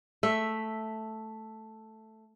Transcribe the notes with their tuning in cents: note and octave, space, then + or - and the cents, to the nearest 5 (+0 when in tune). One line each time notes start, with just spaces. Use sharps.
A3 +0 E5 +0